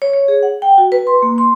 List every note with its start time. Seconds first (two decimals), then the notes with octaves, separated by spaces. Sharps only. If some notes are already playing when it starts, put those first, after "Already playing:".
0.02 C#5
0.13 C#5
0.28 G#4
0.43 F#5
0.62 G5
0.78 F#4
0.92 B4
1.07 C6
1.22 A#3
1.38 C6